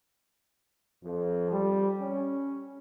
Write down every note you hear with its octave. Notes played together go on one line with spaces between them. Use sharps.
F2
G3
C#4